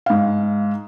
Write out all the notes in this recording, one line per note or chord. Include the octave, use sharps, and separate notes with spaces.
G#2 F5